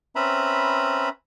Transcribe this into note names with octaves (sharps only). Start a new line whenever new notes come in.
C4 C#4 B4 E5 A#5 B5